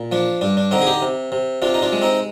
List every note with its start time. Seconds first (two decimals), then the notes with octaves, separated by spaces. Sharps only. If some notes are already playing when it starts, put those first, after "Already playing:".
Already playing: A#2
0.12 F3 D4
0.41 G2 D4
0.57 D4
0.71 D3 C4 D#4
0.82 G#4
0.87 D#4 G4
1.02 C3
1.32 C3
1.62 C3 D4 F4
1.74 D#4
1.82 D4 F4
1.92 G#3
2.02 C4 D#4